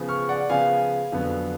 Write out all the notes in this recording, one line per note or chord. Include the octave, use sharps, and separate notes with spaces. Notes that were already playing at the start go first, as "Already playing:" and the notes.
Already playing: C#3 F3 B3
C#6 F6
D5 F#5
C#3 F3 B3 F5 G#5
F2 D3 F#3 B3